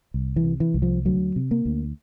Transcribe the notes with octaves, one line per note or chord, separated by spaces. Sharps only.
C2
E3
C3
E3
C2
F3
D2 F#3
C3
A#3
D2